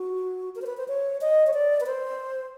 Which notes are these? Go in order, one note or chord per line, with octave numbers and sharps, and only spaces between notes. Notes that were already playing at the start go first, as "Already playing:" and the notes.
Already playing: F#4
A#4
C5
B4
C5
C#5
D#5
C#5
D5
B4
C5